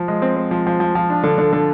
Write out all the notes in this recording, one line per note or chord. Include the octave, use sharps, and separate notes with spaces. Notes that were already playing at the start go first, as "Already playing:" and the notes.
Already playing: F3
G#3
C4
C4
F3
F3
F3
F3
D4
D3
D3
D3